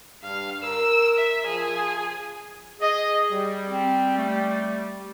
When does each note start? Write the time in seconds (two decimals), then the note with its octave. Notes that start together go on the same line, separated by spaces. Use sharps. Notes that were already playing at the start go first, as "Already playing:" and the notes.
0.23 G2 F5
0.64 A#4 E6
1.17 E5
1.47 F3 G#4
2.80 G#4 D#5
3.31 G3
3.67 C4
4.18 A3